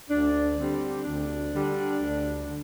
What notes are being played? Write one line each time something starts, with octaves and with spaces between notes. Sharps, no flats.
D2 D4
D3 G3 C4
D2 D4
D3 G3
D2
D3